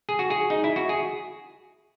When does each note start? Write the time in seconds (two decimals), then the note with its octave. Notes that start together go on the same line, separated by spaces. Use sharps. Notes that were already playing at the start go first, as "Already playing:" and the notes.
0.09 G#4
0.19 F#4
0.30 G#4
0.50 D#4
0.64 E4
0.76 F#4
0.89 G#4